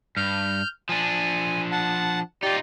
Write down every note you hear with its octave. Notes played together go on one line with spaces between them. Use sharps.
G2 F6 G6
F3 D4 G#5
F#5 A5
D#4 F4 G4 D5